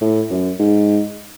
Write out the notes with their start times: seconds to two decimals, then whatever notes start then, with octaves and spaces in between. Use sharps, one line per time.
0.01 A2
0.30 F#2
0.60 G#2